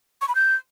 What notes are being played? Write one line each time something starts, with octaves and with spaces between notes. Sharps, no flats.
C#6
B5
G6